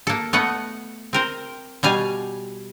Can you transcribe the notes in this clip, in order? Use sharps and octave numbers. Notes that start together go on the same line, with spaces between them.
A#3 A4
A3 B3 D#5 F#5
C4 A#4 C5
B2 G3 F5 G#5